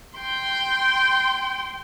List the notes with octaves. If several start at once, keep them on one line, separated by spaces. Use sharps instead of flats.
G5 C6